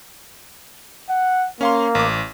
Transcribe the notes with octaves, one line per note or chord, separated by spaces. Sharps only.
F#5
A#3 C#4 F5 C6
A1 D6